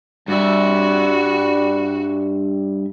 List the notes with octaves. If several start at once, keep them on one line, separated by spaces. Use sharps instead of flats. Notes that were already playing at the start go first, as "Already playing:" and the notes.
G2 G3 F#4 E5